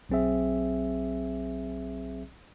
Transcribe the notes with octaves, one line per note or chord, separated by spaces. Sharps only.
B1 F#3 C4 G#4 E5